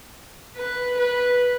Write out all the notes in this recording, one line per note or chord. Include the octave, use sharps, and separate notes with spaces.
B4
B4